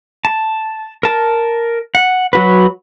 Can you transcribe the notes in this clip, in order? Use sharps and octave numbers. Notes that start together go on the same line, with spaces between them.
A5
A#4 A5
F#5
F#3 F#4 B4